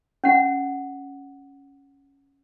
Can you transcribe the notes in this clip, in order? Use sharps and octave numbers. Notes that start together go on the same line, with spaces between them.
C#4 F#5